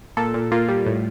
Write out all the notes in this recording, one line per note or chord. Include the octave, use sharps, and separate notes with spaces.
A#2 A4
A#2
A#3 F4
G3
A2